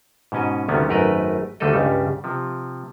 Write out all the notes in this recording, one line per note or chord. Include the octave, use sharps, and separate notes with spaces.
G#2 B2 C#4 D#5
D2 C3 D#3 G3 B3 C#4
G#1 F#2 A3 A#4 B4 D#5
D2 D3 G3 A3 A4 D#5
C#2 G2 C#3 G3
C3 F3